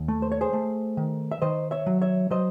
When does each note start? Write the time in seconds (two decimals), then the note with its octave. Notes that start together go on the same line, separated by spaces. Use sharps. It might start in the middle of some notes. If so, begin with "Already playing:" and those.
Already playing: D#2
0.08 A3
0.22 C5
0.32 C#5
0.41 G#4 C5
0.53 A3
0.97 D#3
1.31 E5
1.42 D#3 C5 D#5
1.71 C#5 E5
1.86 F#3
2.02 C#5 E5
2.31 F#3 C5 D#5